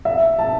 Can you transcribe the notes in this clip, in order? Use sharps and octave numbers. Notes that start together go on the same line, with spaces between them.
E5
A5